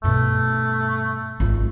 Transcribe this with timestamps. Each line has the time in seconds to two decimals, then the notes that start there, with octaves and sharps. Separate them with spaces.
0.04 G2 B2 A3
1.40 G#1 F4